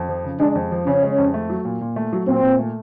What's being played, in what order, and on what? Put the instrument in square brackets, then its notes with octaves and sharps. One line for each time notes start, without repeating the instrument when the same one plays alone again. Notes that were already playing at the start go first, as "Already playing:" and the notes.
Already playing: [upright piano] F2
F3
C#3
[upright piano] G#3 [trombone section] D4
[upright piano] F2
F3
[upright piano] C#3 [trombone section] C#4
[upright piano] G#3
F2
A3
F#3
A#2
A#2
A3
F#3
[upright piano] A#2 [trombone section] C4
[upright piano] A#2
A3